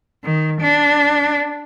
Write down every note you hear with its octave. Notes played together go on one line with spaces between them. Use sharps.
D#3
D4